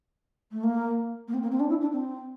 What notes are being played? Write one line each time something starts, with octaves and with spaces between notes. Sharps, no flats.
A3
A#3
A#3
C4
A#3
C4
D4
E4
D4
C4